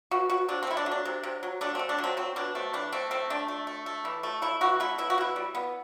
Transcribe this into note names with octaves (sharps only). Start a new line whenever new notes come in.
B2 F#4
B2 F#4
C3 D4
C4
A3 E4
D4
F#3
D4
C3
C3
F#3
A3 D4
A3 C4
D4
F#3
C4
F#3 C4
B2 D4
A3 C4
E3 D4
A3 C4
A3 C4
A3 D4
A3
A3
A3
E3
A3
A3 E4
E3 F#4
A3 E4
B3 E4
F#4
B2 E4
G3
B3